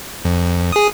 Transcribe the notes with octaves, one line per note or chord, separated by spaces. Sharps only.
F2
G#4 D#6